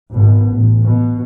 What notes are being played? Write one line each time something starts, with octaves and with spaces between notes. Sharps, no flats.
G#1 B2
A1
B2